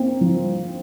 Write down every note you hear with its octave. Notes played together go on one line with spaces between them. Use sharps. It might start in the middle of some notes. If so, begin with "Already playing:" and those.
Already playing: A#3 C4
F3